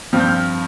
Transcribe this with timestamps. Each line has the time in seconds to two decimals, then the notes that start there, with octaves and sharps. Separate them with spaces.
0.13 G2 F3 C4 F6
0.20 G6
0.28 F6